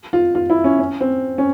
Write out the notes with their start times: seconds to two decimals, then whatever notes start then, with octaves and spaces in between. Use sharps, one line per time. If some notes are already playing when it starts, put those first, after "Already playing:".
0.13 F4
0.35 F4
0.50 E4
0.64 C#4
0.79 C#4
1.01 C4
1.38 C#4